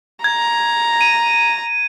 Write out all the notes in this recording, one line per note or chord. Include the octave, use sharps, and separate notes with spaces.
A#5 G#6
D#7